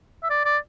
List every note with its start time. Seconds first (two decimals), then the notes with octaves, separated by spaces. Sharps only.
0.23 E5
0.30 D5
0.45 D5